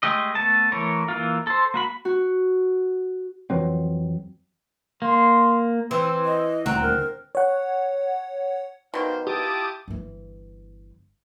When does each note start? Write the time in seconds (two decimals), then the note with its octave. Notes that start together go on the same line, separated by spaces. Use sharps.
0.03 G#3 A3 G4 D#5
0.35 A3 B3 A5
0.72 E3 A3 A#4 C#5
1.08 E3 A#3 F4
1.47 A4 C5
1.74 A#3 F#4 B5
2.05 F#4
3.50 F2 E3 F#3 C4
5.02 A#3 C6
5.91 E3 C4
6.26 D#5
6.66 D#1 D2 C4 F#5 A#5
6.82 A#4
7.35 C#5 F#5
8.94 B2 D#3 C5 D5 F5
9.27 E4 F4 G4 A5 D6 D#6
9.88 G1 E3